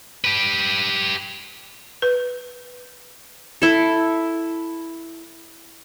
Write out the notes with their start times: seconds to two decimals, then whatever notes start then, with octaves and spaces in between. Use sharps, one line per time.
0.24 G4 B4
2.02 B4
3.62 E4 A4